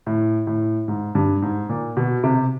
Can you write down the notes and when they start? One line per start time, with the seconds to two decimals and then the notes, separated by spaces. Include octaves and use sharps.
0.06 A2
0.47 A2
0.88 G#2
1.15 G2
1.42 G#2
1.69 A#2
1.97 B2
2.24 C3